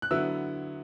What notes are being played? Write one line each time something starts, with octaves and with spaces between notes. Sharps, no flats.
F#6
D3 F#3 B3 E4 E6